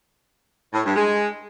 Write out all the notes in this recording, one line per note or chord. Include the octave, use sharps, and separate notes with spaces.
A2
G2
G#3